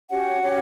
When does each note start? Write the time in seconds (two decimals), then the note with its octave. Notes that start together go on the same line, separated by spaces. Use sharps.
0.10 C#4 F#4 G4 C#5 F#5
0.42 C#4 G4 C#5